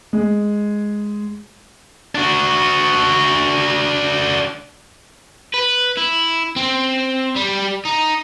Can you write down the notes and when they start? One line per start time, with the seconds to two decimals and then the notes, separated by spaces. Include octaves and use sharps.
0.13 G#3
2.15 D4 F#4
5.54 B4
5.97 E4
6.56 C4
7.36 G3
7.85 D#4